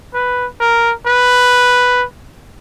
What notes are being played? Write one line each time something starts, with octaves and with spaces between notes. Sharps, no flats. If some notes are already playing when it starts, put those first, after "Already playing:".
B4
A#4
B4